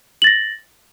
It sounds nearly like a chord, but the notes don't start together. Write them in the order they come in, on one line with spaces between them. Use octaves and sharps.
F#7 A6 A#6